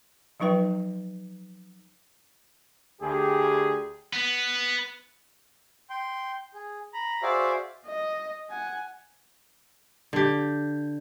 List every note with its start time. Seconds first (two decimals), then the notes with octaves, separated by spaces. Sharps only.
0.40 F3 F#3 D#4 B4 G5
3.01 D2 G4 G#4
4.13 B3
5.90 G5 C6
6.54 G#4
6.93 A#5 B5
7.23 F#4 G#4 C5 D5 E5 F5
7.87 D#5
8.50 F#5 G#5
10.13 D3 G4